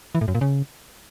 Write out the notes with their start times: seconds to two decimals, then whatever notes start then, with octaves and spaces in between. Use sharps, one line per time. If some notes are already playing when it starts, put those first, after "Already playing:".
0.15 E3
0.21 A2
0.28 F#2
0.35 A#2
0.41 C#3